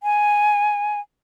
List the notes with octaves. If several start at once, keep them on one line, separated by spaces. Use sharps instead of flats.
G#5